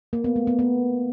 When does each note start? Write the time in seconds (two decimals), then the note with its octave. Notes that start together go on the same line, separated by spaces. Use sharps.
0.13 A#3
0.24 B3
0.36 A3
0.47 B3
0.59 B3